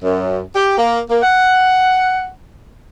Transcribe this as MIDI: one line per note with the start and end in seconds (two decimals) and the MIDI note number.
0.04 0.40 42
0.56 0.74 67
0.77 1.01 58
1.10 1.19 58
1.23 2.28 78